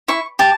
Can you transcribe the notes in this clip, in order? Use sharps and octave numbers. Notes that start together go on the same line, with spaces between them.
E4 C#6
G4 A5